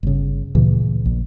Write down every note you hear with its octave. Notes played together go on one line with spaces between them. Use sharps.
G1 C#3
D2 A#2 C#3 E3
A#1